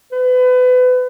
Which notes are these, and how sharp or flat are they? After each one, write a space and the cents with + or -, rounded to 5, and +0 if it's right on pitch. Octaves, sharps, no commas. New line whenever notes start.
B4 +30